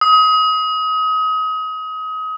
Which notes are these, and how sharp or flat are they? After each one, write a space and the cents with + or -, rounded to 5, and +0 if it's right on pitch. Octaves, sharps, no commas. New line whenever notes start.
D#6 +30